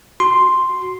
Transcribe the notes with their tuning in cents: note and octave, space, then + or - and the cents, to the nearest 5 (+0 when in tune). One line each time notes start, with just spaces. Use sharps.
F#4 +0 C6 +0